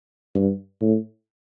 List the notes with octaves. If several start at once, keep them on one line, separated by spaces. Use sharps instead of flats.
G2
A2